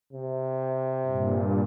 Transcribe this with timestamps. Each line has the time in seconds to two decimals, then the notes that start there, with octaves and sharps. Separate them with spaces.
0.13 C3
1.06 G2 A#2